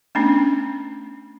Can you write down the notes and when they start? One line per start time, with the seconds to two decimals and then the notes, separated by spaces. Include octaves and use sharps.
0.15 A3 B3 C#4 D4